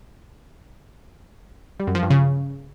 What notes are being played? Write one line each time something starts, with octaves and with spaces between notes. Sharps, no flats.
G3
F#2
F3
G2
C#3